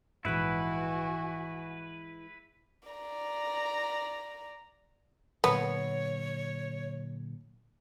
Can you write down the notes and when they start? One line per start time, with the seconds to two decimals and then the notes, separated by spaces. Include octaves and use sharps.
0.25 A#1 G#2 E3 G#3 E4 F#4 B4 G#5
2.88 D5 A#5
5.44 A#2 D3 F#3 B3 C#5